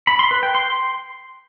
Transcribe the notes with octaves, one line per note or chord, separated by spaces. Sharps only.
B5
C6
B4
G5
C6